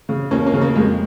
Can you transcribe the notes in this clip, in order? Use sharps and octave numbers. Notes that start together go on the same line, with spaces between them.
C#3
D#2 A#3 C#4
A#3 C#4
C#3
A#3
F2 G#3